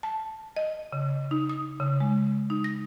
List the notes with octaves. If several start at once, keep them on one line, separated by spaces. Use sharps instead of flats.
A5
D#5
C#3
D#4
D#6
C#3
G#3
D#4
A#6